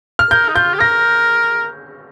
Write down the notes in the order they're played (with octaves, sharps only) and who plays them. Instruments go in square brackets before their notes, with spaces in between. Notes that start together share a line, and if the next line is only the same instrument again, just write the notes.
[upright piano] F6
[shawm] A#4 [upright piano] G6
[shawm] D#4
[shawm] F4 [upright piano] G6
[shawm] G4
[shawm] A#4 [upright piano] A#6